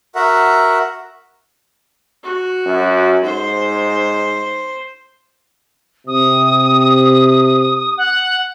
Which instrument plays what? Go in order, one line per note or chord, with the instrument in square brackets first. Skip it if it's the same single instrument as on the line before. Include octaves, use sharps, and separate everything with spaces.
[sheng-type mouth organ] F#4 A#4 E5 F#5
[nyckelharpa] F#4
[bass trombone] F#2
[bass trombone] G#2 [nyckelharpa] C5
[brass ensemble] C3 [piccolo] D#6
[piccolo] F#5